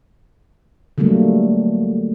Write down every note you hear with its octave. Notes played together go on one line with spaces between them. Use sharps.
D3 F#3 G3 A3 A#3